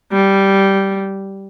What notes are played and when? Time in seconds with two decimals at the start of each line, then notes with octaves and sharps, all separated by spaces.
0.12 G3